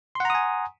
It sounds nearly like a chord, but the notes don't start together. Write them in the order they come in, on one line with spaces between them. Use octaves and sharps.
C6 F#5 A#5 D#6 G#5